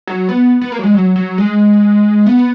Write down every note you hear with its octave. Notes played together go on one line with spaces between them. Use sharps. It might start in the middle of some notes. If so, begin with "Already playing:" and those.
F#3
B3
B3
A#3
F#3
G#3
F#3
F#3
G#3
B3